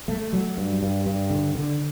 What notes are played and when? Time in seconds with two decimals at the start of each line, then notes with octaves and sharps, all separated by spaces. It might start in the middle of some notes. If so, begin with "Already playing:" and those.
0.08 A3
0.33 F#3
0.57 G2
0.82 G2
1.06 G2
1.30 D3
1.55 D3